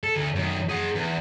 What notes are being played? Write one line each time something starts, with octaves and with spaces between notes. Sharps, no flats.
A4
D2
F#2 D#3
G#4 F#5
E2